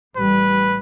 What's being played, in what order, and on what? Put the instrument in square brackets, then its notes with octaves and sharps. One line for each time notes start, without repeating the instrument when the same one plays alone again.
[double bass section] A1 G3 [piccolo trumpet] B4